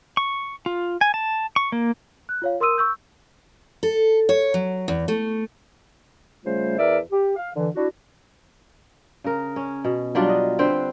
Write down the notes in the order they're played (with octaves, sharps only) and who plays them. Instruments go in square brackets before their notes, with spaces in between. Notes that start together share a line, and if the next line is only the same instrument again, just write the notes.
[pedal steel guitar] C#6
F4
G#5
A5
C#6
A#3
[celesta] F#6
F4 C#5 F5
A#4 C6 D#6 E6 D#7
C#6 E6 G6
[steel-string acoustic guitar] A4
C#5
F#3
E2
A3
[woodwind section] C#3 G3 A3 F4 C5
E2 A#4 D5 E5
G4
F5
D3 E3
D4 E4 F#4
[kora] C#3 A#4
C#4
B2
F#3 G3 D4 F4
D#5
D3 C4 B4 C5